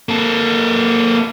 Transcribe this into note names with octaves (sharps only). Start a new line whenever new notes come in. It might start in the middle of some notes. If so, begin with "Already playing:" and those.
A#3 A4